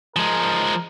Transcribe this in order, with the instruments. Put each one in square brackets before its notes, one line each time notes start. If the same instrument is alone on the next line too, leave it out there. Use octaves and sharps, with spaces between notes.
[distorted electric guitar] F3 G#3 [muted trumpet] A#4